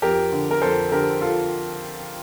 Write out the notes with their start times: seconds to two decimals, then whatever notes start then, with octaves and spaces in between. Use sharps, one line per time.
0.02 F2 G4 A#4
0.32 D3
0.51 A#4
0.62 F2 A4 C5
0.92 D3 G4 A#4
1.21 F4 A4